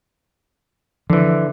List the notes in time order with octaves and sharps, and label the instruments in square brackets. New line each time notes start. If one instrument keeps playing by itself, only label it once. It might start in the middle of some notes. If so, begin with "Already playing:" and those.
[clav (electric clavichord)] D3 E3 [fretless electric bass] F3